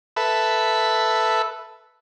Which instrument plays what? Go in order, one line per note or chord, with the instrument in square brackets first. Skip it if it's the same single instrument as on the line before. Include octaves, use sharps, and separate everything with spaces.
[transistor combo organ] A4 B4 E5